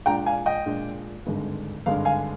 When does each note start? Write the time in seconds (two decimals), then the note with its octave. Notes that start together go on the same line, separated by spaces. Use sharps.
0.06 A#2 G#3 D4 F4 G5 A#5
0.26 F5 G#5
0.46 D#5 G5
0.66 A#2 G#3 D4 F4
1.26 G#1 G2 D3 G#3
1.86 G#1 G2 D3 G#3 F5
2.05 F5 G#5